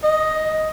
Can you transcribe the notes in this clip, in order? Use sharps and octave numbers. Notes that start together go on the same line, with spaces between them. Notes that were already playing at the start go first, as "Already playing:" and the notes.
D#5